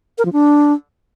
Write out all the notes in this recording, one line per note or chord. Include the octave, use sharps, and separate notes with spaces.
A#4
F3
D4